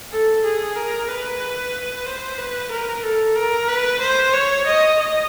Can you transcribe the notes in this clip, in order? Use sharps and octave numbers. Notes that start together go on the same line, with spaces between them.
A4
G#4
A#4
B4
C5
B4
A#4
A4
A#4
B4
C5
C#5
D#5
D#5